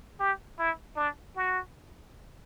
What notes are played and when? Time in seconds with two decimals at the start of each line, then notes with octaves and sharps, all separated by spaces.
0.20 G4
0.59 E4
0.96 D4
1.36 F#4